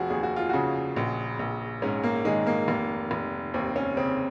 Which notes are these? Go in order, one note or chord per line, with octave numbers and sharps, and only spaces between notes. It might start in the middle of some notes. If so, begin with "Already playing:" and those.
Already playing: F1 F3 F#4 G#4
D#2 G#4
F#4
F4
C#3 F#4
A#1
A#1
G#2 C#4
A#3
D#3 G#3
A#3
F1 A#3
F1
D#2 C4
C#4
C#3 C4